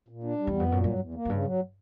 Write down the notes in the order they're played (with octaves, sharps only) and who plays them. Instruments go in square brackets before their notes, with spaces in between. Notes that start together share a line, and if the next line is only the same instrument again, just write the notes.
[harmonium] A#2
D4
G3
[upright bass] E2
[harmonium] B3
[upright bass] F2
[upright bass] F#2 [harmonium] A#2
[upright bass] G2 [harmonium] F#3
[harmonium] E2
A#3
[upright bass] F#2
[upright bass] G2 [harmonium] C#3
[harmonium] F#3